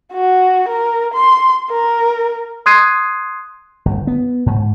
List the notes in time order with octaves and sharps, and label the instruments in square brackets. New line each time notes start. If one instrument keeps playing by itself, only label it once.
[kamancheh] F#4
A#4
C6
A#4
[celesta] C6 D#6 F#6 G#6 C7 D#7
[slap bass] G1
B3
G#2